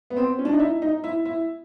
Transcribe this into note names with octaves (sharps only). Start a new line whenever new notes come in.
B3
C4
C#4
D4
D#4
E4
D#4
E4
E4